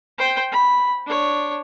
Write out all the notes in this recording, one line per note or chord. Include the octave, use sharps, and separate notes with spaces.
C5 G5
B5
D4 C#5